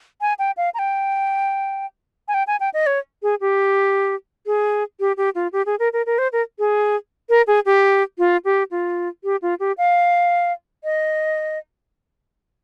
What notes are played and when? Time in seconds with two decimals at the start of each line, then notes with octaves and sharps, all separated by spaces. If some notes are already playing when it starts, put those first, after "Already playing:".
0.21 G#5
0.39 G5
0.57 F5
0.74 A#5
0.79 G5
2.28 G#5
2.34 G5
2.47 G#5
2.60 G5
2.74 D#5
2.87 C#5
3.23 G#4
3.41 G4
4.46 G#4
5.00 G4
5.17 G4
5.35 F4
5.53 G4
5.66 G#4
5.79 A#4
5.93 A#4
6.06 A#4
6.18 C5
6.33 A#4
6.59 G#4
7.29 A#4
7.47 G#4
7.66 G4
8.18 F4
8.45 G4
8.71 F4
9.24 G4
9.42 F4
9.60 G4
9.78 F5
10.84 D#5